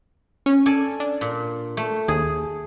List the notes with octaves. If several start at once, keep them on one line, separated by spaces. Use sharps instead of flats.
C#4
A4 D5 G#5
D4
A#2
A3
D#2 G#4